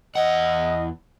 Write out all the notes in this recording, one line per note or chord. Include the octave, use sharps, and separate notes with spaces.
E2 D#5 F#5